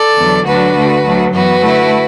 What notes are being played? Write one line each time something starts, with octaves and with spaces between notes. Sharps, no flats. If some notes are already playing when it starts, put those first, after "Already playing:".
Already playing: A4 D5
E2 D3 F#3
D2 D3 F#3 D4 F#4 B4
D2 D3 A3
D2 D3 F#3 A3
F#2 E3 B3 F#4 B4
D3 A3 E4